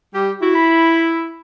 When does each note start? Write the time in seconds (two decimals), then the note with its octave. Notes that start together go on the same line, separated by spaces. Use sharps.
0.13 G3 G4
0.41 E4 F#4
0.55 B5